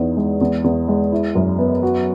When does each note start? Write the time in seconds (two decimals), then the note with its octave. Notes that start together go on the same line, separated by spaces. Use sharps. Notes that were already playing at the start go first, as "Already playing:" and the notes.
Already playing: E2 B3 D#4
0.17 G#3
0.41 E2
0.64 E2
0.88 G#3
1.12 E4
1.35 F#2
1.59 B3
1.83 F#4